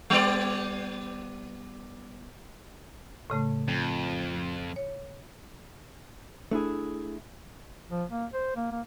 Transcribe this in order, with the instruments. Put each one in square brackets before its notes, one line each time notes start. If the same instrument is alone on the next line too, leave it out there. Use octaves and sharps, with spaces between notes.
[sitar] G3 B3 D5
[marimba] A2 C#3 A3
[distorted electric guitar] F2
[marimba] C#5
[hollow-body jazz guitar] A3 D4 E4 G#4
[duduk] F3
A#3
C5
A#3
A#3